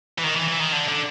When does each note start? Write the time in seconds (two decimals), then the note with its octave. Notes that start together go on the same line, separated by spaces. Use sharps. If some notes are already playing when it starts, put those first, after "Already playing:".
0.19 E3
0.24 D#3
0.36 E3
0.48 E3
0.60 D#3
0.72 D3
0.88 D3